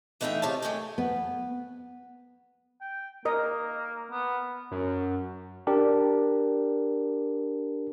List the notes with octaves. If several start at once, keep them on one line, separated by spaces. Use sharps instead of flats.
E3 A3 D#4 F4 E5 G5
C3 C#5 F5 A5
D#3 A3 G5 G#5
B3
G5
A#3 A#4 D#5
B3
F#2
D4 G4 A#4